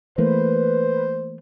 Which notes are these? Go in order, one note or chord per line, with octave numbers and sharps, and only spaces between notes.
E3 A3 A#3 B4 C5